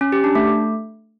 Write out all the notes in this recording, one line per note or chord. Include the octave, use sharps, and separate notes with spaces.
C#4
G4
D4
A3